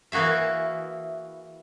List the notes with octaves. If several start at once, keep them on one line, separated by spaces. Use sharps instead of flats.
E3 A#3 F#4 G#4 E5